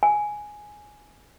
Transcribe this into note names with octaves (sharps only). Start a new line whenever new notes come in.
G#5